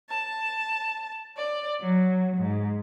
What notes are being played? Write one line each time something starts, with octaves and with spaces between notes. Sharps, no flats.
A5
D5
F#3
G#2